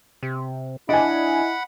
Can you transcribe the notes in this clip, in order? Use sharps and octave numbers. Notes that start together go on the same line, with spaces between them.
C3
D4 E4 D#5 F#5 G#5 B5